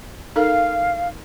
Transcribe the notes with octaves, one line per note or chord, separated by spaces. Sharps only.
D#4 A4 A#4 F5